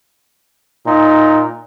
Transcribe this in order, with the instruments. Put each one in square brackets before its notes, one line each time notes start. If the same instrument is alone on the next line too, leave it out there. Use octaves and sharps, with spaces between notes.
[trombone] A#2 [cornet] D#4